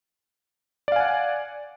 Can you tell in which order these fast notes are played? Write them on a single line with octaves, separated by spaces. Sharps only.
D5 F5 G#5 F#5